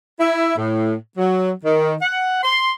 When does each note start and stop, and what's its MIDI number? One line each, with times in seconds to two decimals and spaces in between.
0.20 0.55 64
0.56 0.95 45
1.17 1.51 54
1.64 1.94 51
2.01 2.39 78
2.43 2.69 84